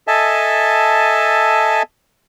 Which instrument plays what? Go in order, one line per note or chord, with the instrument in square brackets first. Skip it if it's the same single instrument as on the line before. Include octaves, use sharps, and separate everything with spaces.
[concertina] A4 D#5 E5 G#5 A5